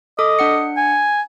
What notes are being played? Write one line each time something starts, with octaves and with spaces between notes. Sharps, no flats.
A4 D#5 D6
D4 F#5 C#7
G#5